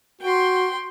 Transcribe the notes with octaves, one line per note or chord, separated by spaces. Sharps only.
F#4 G5 C6